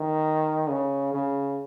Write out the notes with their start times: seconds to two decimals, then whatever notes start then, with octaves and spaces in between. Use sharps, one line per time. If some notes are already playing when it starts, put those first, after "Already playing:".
Already playing: D#3
0.69 C#3
1.14 C#3